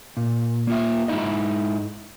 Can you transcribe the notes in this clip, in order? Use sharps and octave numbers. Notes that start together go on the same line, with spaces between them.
A#2
A#3 F4 E5
G#2 E3 D#4 E4 D#5